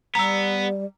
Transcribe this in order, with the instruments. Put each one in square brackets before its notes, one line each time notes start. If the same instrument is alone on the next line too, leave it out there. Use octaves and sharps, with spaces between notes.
[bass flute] G3 [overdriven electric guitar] B3 [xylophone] A#5 E6